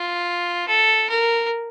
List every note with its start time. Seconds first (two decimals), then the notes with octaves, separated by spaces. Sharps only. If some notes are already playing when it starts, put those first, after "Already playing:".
Already playing: F4
0.68 A4
1.10 A#4